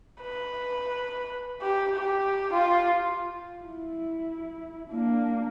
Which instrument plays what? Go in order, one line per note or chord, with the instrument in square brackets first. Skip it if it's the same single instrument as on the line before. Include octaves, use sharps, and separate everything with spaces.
[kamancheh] B4
G4
G4
F4
[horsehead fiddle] E4
A#3 D4